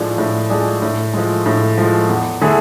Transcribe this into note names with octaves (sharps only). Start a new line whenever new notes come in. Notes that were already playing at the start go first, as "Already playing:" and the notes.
Already playing: A2 F3 G#3 D4 G#4
A2
F3 G#3 D4 G#4
A2
F3 G#3
A2
F3 G#3
E2
D3 A3 E4 G#4